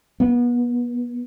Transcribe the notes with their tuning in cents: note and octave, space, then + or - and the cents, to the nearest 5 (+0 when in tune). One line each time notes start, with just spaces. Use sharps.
B3 -30